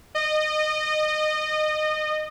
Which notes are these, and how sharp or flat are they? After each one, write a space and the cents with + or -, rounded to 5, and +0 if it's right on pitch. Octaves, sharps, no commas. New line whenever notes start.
D#5 -25